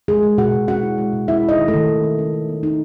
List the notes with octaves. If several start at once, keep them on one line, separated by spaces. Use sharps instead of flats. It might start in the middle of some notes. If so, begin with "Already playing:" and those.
G#3 G#4
G#3
B2 F#4 F#5
B2
C#4 F#4 F#5
E4
G#3
B2
C#4 E4 E5
C#4
D#4 D#5
D#3
A3 A4
D#3
A3
A3
C#4
C#4
B3
D#4